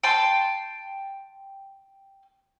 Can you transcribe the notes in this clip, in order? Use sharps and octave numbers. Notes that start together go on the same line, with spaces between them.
G5 A5 C6